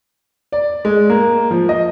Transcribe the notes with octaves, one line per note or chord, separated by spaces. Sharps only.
D5
G#3
A#3
F3
D#5